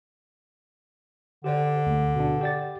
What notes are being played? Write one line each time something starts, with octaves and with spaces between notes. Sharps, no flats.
D3 G4 C5 D5
D2
B2 D4
G4 D5 A6